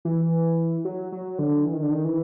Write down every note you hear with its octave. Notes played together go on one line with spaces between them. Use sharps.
E3
F#3
F#3
D3
E3
D#3
D3
D#3
E3